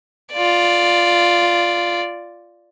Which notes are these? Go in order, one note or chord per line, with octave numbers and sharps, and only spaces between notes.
F4 D5